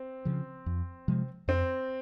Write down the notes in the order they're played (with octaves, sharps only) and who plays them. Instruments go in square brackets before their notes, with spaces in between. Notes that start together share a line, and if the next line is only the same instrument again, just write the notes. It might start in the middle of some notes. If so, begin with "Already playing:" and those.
Already playing: [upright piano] C4
[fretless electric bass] C#3 F3
F2
C3 F3 G#3
[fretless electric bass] F2 [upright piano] C4